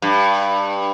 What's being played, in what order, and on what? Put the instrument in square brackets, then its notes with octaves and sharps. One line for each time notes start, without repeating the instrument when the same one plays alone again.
[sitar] G2